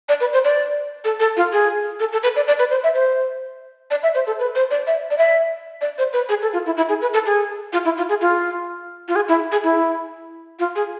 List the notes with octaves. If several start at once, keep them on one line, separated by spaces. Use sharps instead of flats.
D5
B4
C5
D5
A4
A4
F4
G#4
A4
A4
B4
D5
D5
B4
C5
E5
C5
D5
E5
C5
A4
B4
C5
D5
E5
D5
E5
D5
C5
B4
G#4
A4
F4
E4
E4
G#4
B4
A4
G#4
F4
E4
F4
G#4
F4
F4
G#4
E4
G#4
E4
F4
G#4